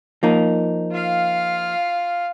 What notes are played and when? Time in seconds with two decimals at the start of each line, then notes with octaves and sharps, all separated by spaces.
0.23 F3 A#3 D#4
0.93 F4 F5